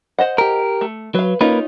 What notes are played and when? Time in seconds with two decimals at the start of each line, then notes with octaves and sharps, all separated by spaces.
0.19 C5 D#5 F#5
0.38 G4 A#4
0.81 A3
1.15 F#3 B4 F5
1.41 A#3 C#4 D#4 F4 B4